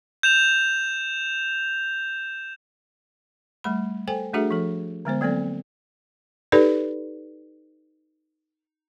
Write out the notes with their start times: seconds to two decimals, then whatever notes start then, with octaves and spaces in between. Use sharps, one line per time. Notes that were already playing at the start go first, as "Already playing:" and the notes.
0.23 G6 E7 F7
3.64 G3 A3 B5
4.08 A4 C5 G5 G#5
4.34 A3 D4 F#4 G#4 A4 E5
4.51 F3 A4
5.05 D3 G#3 B3 C5
5.21 F#3 A#3 C4 A4 D5
6.52 D#4 G4 A4 B4 D5